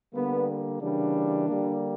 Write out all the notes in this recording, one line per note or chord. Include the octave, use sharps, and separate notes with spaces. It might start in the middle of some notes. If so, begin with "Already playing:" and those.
D3 G3 A#3 B3
C#3 E3 G3 A#3 D4
D3 G3 A#3